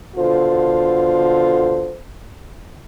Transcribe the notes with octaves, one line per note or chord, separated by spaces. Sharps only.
B2 D3 F4 A4 C5